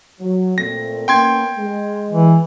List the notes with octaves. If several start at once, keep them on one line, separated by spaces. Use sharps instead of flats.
F#3
A#2 A3 C4 A#6
A#3 B3 C#4 G5 C6 G#6
G#3
E3